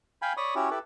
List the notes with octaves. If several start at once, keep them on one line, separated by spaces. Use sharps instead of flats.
F5 G5 G#5 B5
C#5 D5 B5 C#6 D#6
C#4 E4 F#4 G4 C#5
E4 G4 A4 B4